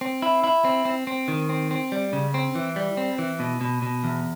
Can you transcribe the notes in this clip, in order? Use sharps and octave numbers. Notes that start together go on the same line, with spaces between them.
C4
E4
E4
C4
C4
C4
D#3
C4
C4
G3
C#3
C4
E3
G3
C4
E3
B2
B2
B2
E2